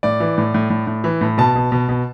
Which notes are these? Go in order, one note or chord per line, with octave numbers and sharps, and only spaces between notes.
A2 D5
E3
A2
A2
A2
A2
E3
A2
B2 A5
B2
B2
B2